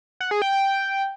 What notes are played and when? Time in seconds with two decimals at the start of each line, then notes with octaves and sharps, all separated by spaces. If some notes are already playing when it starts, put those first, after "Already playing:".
0.21 F#5
0.31 G#4
0.42 G5
0.52 G5